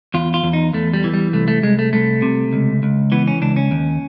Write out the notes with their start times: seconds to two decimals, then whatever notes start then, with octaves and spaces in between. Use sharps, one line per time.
0.14 E2 F4
0.34 F4
0.43 E2
0.53 D#4
0.73 E2 A3
0.94 G3
1.04 E3
1.14 G3
1.33 C2 A3
1.48 A3
1.63 C2 G#3
1.79 A3
1.93 C2 A3
2.22 C3
2.53 C#2
2.83 C#2
3.12 E3 B3
3.28 C#4
3.42 C#2 D4
3.56 C#4
3.71 D#2